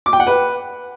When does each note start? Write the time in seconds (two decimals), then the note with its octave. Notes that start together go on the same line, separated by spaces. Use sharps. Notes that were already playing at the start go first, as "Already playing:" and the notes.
0.06 D6
0.13 G5
0.20 F#5
0.27 B4